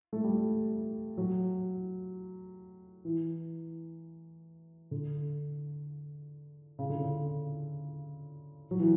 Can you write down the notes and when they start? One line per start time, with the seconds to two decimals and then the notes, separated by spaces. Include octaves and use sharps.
0.13 A3
0.24 G3
1.18 F#3
3.05 E3
4.91 D3
6.79 C#3
6.89 D3
7.00 C#3
8.71 F#3
8.80 E3